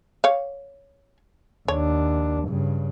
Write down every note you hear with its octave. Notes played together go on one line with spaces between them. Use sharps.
C#5 F5
D#2 D4 C#5
G2 C#3